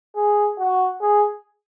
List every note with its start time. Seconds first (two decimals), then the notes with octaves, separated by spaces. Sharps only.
0.15 G#4
0.59 F#4
1.01 G#4